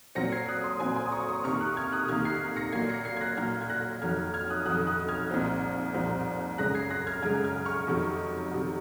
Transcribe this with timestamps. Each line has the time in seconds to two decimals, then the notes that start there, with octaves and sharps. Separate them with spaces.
0.15 A#2 F#3 C4 A#6 C#7
0.32 G#6 C7
0.48 D#6 F#6
0.64 C6 D#6
0.80 A#2 F#3 C4 G#5 C6
0.96 G#5 C6
1.06 D#6
1.12 A#5 C#6
1.29 C6 D#6
1.44 C3 D#3 A#3 C#6 F6
1.60 D#6 F#6
1.77 F6 G#6
1.92 D#6 F#6
2.08 C3 D#3 A#3 F6 G#6
2.25 G#6 C7
2.56 A#6 C#7
2.72 A#2 F#3 A#3 G#6 C7
2.89 A#6 C#7
3.05 G#6 C7
3.17 G#6
3.21 F#6 A#6
3.37 A#2 F#3 A#3 F6 G#6
3.61 G#6
3.70 F#6 A#6
4.01 F2 D#3 F#3 F6 G#6
4.34 F6 G#6
4.50 D#6 F#6
4.65 F2 D#3 F#3 D#6 F#6
4.87 D#6 F#6
5.08 F6 G#6
5.30 C2 A#2 F3 C4 D#4
5.94 C2 A#2 F3 C4 D#4
6.58 F#2 C#3 G#3 F#6 A#6
6.74 G#6 C7
6.90 F#6 A#6
7.07 F6 G#6
7.22 F#2 C#3 G#3 F6 G#6
7.44 F6 G#6
7.65 C#6 F6
7.87 F2 C3 D#3 F#3
8.51 C3 D#3 F#3